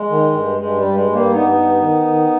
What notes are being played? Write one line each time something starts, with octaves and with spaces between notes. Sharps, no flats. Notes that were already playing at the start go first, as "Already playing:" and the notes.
Already playing: G#3
D#3
G2
G2 G#3
G3
G2
G#3
G2
G3 A#3
G2 B3 D#4
G2
D#3
D#3